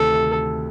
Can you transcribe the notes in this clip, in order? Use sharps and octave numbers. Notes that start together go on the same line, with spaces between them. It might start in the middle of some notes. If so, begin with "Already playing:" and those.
Already playing: D2 C3 D#3 A4